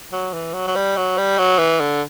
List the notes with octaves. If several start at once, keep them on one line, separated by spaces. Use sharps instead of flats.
F#3
E3
F#3
F#3
G3
F#3
G3
F#3
E3
D3